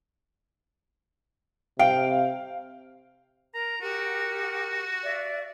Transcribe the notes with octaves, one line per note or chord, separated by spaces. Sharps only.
C3 F5 G5
A#4 A#5
F#4 G4 A#4 F#5
D5 E5 F5